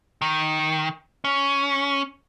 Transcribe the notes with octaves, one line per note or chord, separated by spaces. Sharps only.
D#3
C#4